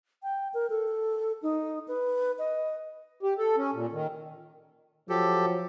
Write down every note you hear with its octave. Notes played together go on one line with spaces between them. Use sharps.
G5
A#4
A4
D#4
B4
D#5
G4
A4
C#4
A#2
D#3
F3 F#3 G4 A4